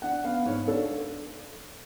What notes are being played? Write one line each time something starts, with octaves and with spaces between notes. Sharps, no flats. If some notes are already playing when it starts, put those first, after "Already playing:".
D4 F#5
B3 F5
G#2 C#5
D4 A4